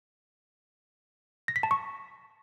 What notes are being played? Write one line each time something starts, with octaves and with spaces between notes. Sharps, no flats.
A#6
B6
A5
C#6